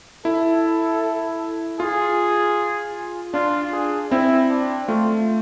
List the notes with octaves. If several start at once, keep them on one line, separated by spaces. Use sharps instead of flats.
E4 A4
F4 G#4
D4 F4
G#4
C4 E4
D4
A3 F4